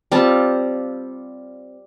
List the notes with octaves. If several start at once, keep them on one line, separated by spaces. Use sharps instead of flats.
G3 C4 F4 A5